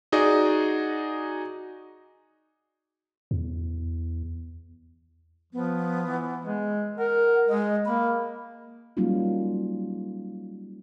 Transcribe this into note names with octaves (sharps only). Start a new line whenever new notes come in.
D#4 F#4 G#4 D5 D#5
E2
F3 B3
E3
G#3
A#4 F#5
G#3 D#5
A#3 B5
F#3 G3 A#3 C#4 D#4 F4